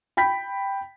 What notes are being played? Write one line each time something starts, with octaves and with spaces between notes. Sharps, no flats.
G5 B5 B6